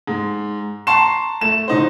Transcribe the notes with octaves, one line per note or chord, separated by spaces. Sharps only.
G#2
A5 A#5 C6 C#6 C7 E7
A3 E7
D1 D#4 C5